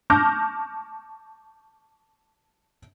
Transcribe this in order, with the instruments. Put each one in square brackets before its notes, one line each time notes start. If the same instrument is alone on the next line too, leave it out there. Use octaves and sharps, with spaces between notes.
[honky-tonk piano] A5 C#6 D6 F6 G6 A#6